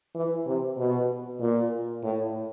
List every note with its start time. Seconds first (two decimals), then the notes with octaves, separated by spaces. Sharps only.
0.15 E3
0.46 C3
0.77 B2
1.40 A#2
2.03 A2